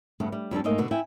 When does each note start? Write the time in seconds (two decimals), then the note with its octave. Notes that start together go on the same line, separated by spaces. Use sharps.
0.20 G2 C#3 A3 B3
0.32 G3
0.51 F2 G3 D4 A4
0.64 G#2 A3 A#3 A#4 D#5
0.78 B2 D3 B3
0.91 E4 G5 G#5